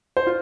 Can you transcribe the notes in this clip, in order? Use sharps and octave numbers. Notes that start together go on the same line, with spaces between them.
C5
F4